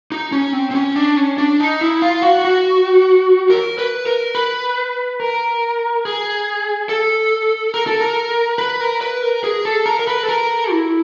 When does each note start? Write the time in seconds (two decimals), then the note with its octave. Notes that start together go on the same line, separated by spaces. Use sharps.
0.12 D#4
0.32 C#4
0.53 C4
0.71 C4
0.75 C#4
0.96 D4
1.17 C#4
1.38 D4
1.60 D#4
1.81 E4
2.02 F4
2.22 F#4
2.45 F#4
3.50 A#4
3.78 B4
4.06 A#4
4.35 B4
5.20 A#4
6.05 G#4
6.89 A4
7.74 A#4
7.87 A4
8.01 A#4
8.58 B4
8.81 A#4
9.01 B4
9.22 A#4
9.44 G#4
9.65 A4
9.86 A#4
9.99 A#4
10.07 B4
10.23 A4
10.29 A#4
10.70 E4